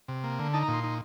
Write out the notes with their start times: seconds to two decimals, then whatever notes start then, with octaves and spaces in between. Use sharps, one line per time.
0.08 C3
0.24 A#3
0.39 D3
0.53 D#4 A5
0.63 A#5
0.68 A#2
0.74 C6
0.84 D#4